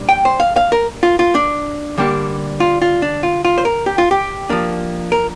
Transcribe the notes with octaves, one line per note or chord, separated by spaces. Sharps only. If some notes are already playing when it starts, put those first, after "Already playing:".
Already playing: A#2 G3 D4
G5
C5
F5
F5
A#4
F4
F4
D4
D3 G3 A#3 D4
F4
F4
D4
F4
F4
C5
A#4
G4
F4
G4
F3 A#3 D4
A#4